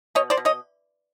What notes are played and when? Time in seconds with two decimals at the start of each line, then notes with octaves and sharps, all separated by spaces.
0.15 B2 C#5 D#5
0.30 C5 D5
0.37 B2
0.45 C#5 D#5